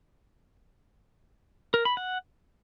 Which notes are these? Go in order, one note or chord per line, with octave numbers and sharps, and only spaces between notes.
A#4
B5
F#5